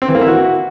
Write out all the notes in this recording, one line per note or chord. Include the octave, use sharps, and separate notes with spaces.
C4
E3
A#3
E4
F#4